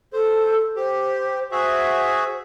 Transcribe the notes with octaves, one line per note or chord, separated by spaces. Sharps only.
A4 C5
G4 C5
F#4 G#4 C5 E5